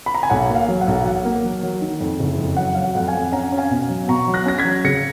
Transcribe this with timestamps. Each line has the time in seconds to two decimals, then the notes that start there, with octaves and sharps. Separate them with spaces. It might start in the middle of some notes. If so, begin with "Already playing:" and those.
0.06 B5
0.15 A#5
0.23 G#5
0.30 B1 F#5
0.50 A#3
0.55 F5
0.68 F#3
0.81 F#5
0.88 B1
1.05 F#3 F#5
1.25 A#3
1.43 F#3
1.63 F#3
1.81 D#3
2.01 F2
2.20 F#1
2.39 F2
2.57 F#3 F#5
2.75 F#3 F5
2.83 F#5
2.95 F2 F#5
3.07 F5 G#5
3.14 F2
3.32 C#4 F#5 A#5
3.52 C#4
3.58 F5 G#5
3.71 B2
3.89 F#3
4.08 B2 A#5 C#6
4.28 F#3
4.34 F#6 A#6
4.46 C#4 A#6
4.58 G#6 B6
4.65 F#3
4.84 C#3 A#6 C#7